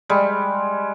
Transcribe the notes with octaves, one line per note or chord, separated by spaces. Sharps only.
G3 G#3